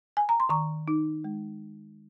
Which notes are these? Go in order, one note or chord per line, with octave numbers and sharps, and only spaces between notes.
G#5
A#5
C6
D#3 A#5 C#6
D#4
G#3